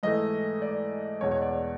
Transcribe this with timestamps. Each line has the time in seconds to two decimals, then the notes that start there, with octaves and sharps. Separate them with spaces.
0.03 G#2 E3 A3 D#5
0.62 D5
1.21 E2 B2 G#3 C#5
1.31 C#5
1.42 D5